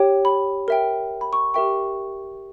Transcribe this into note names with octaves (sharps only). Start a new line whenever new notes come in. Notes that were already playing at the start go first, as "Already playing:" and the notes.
Already playing: G4 C#5 G5
B5
A#4 E5 G5
B5
C#6
G4 A#4 E5 G5 C#6